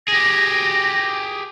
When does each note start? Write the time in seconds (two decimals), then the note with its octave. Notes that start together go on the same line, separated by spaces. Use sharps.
0.08 G4 G#4 A#6